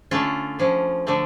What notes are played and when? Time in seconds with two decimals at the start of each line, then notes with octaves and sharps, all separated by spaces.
0.11 D3 A3 C#4 F4
0.59 D3 F3 C#4
1.07 D3 F3 A3